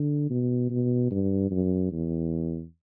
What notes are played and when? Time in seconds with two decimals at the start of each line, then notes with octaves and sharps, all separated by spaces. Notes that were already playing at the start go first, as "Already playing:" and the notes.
Already playing: D3
0.30 B2
0.70 B2
1.11 G2
1.51 F#2
1.92 E2